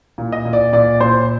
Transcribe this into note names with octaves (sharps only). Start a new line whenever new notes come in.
A#2
D#5
A#2
D5
A#2 D5
A#2 C5